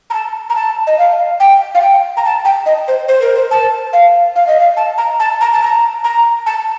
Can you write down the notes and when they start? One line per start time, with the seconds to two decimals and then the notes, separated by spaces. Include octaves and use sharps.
0.10 A#5
0.14 A5
0.50 A#5
0.55 A5
0.87 D#5
0.98 F5
1.40 G5
1.75 F5
1.82 G5
2.17 A#5
2.25 A5
2.45 G5
2.66 D#5
2.88 C5
3.08 C5
3.21 A#4
3.35 C5
3.51 A5
3.93 F5
4.36 F5
4.47 D#5
4.60 F5
4.77 A5
4.98 A#5
5.20 A5
5.41 A#5
5.53 A5
5.62 A#5
6.04 A#5
6.46 A5